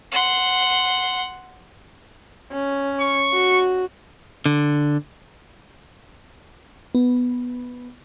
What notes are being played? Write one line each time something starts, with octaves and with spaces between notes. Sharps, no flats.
F#5 C6
C#4
C#6
F#4
D3
B3